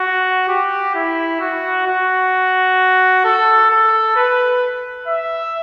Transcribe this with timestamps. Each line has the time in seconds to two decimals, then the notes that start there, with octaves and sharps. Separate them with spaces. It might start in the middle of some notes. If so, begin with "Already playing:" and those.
Already playing: F#4
0.48 G4
0.95 E4
1.40 F#4
1.86 F#4
3.24 A4
3.70 A4
4.16 B4
5.07 E5